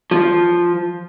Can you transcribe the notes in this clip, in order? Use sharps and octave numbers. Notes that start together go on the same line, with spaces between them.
F3